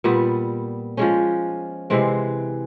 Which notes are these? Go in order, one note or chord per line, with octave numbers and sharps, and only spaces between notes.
A#2 G3 B3
F3 G#3 C#4
C3 E3 G#3 C4